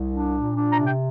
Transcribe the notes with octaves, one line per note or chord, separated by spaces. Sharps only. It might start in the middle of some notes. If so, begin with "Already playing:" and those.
Already playing: C2
D4
A#2
D4
A#5
C3
G5